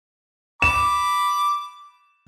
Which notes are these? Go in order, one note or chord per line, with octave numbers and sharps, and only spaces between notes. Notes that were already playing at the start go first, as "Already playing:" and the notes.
B5 D6 E7